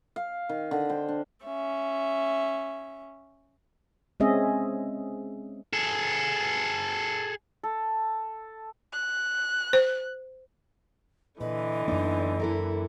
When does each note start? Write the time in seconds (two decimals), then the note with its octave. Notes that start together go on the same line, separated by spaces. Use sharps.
0.16 F5
0.49 D#3
0.71 D3
0.90 C5 G5
1.09 D4
1.45 C#4 E5
4.20 G#3 C4 C#4 G#4 D#5 E5
5.73 G#4 A4
7.63 A4
8.93 F#6
9.73 C5
11.41 A#2 D3 E3 B4 D#5
11.88 F#2 A#3 B3 D4 D#4
12.39 E4 A4 A#4